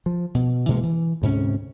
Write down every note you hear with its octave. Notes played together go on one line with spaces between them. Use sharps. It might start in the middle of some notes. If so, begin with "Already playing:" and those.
F3
B2
B2 E3 G#3 A#3
E3
D2 G#2 C3 C#4